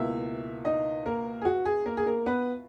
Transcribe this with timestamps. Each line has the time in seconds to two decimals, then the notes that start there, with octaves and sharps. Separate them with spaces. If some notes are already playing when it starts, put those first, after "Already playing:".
Already playing: C#2 B2 A#3 E4 E5
0.65 D#4 D#5
1.06 A#3 A#4
1.42 G#4
1.45 F#4
1.65 G#4
1.86 A#3 A#4
1.97 G#4
2.06 A#3 A#4
2.26 B3 B4